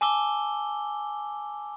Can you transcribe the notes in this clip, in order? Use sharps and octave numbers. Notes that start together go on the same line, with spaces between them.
G#5 A5 D6 E6 G7